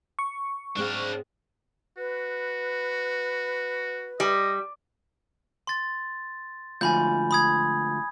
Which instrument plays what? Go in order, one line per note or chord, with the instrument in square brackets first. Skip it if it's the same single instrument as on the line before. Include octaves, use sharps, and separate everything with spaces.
[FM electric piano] C#6
[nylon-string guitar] G#2 G#3 C4 [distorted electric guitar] D4 F5
[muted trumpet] F#4 [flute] B4
[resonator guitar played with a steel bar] G3 [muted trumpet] D#5
[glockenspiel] C6 A6
[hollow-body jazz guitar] D2 G#2 F3 [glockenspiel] G#5 B5 G6
[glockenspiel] B5 D#6 G#6